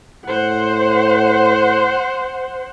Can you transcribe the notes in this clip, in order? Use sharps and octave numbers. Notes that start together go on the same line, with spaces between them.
A2 C5 F#5